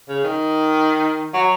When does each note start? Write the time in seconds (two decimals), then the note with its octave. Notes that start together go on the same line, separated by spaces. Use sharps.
0.09 C#3
0.24 D#3
1.34 F#3